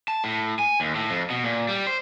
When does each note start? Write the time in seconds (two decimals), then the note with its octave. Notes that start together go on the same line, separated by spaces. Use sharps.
0.08 A5
0.24 A2
0.59 G#5
0.80 D#2
0.95 A2
1.10 F2
1.30 B2
1.44 A#2
1.68 G3
1.87 C5